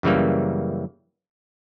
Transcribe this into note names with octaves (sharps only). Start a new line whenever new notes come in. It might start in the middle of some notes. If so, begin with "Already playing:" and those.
F#2 C#3 E3 G3 A#3